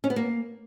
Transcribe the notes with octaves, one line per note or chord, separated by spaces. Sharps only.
C#4
B3
A#3